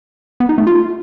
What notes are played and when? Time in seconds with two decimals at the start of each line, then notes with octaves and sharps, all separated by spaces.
0.40 B3
0.49 D#4
0.58 A3
0.67 F4